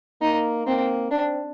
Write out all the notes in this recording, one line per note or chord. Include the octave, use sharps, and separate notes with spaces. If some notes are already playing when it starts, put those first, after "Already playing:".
A#3 D#4
A#3 C4
C4 D4